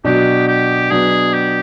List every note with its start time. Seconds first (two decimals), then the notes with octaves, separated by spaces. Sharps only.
0.04 B2 F#3 B3 D4 G4
0.48 G4
0.91 B2 F#3 B3 D4 G#4
1.34 G4